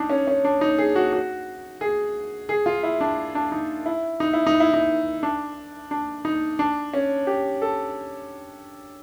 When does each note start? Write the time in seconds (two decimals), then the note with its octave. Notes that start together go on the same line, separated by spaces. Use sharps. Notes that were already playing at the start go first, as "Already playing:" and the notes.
Already playing: D4 D#4
0.10 C#4
0.27 C#4
0.44 D4
0.61 D#4
0.78 G#4
0.96 F#4
1.13 F#4
1.81 G#4
2.49 G#4
2.66 F4
2.83 E4
3.01 D4
3.35 D4
3.52 D#4
3.86 E4
4.20 D#4
4.33 E4
4.47 D#4
4.60 E4
4.74 D#4
5.23 D4
5.91 D4
6.25 D#4
6.59 D4
6.93 C#4
7.27 G4
7.62 A4